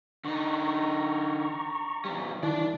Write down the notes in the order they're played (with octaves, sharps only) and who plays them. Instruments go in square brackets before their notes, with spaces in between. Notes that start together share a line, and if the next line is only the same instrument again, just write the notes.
[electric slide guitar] D3 D#4 [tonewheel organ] A#5 C#6
[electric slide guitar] E2 G3
[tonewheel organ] D#3 E4 [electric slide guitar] D5 A5